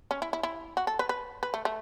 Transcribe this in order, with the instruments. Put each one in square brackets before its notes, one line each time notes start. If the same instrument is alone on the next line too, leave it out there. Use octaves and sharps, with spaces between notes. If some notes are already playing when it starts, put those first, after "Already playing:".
[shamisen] C#4
E4
E4
E4
F#4
A4
B4
B4
B4
A3
A3